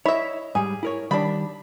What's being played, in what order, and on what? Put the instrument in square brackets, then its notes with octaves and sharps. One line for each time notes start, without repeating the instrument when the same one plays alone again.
[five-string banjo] E4 E5 [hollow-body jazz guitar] C#5 D#5
[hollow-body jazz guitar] G#2 G3 [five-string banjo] G#4
[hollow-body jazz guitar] E4 A#4 C#5
[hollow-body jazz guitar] D#3 G3 [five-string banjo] D4 B5